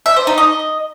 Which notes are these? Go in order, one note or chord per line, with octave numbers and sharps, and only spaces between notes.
E5
C5
D#4
D#5